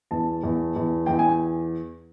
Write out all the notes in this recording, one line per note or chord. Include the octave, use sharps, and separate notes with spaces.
E2 A5
E2
E2
E2 G5
G#5